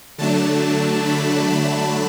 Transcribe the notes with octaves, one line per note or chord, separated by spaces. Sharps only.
D3 F#3 A3 D4 A5
B5
B5